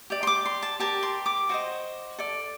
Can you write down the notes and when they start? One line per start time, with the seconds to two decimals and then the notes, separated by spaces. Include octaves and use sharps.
0.10 G4 D5
0.23 C6
0.27 D6
0.46 C6
0.62 A5
0.80 G4 A#4 D5 A5
1.03 C6
1.26 D6
1.49 F#4 C5 D#5
2.18 A4 D5